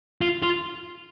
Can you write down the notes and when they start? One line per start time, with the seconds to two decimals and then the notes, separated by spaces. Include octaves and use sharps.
0.21 F4
0.43 F4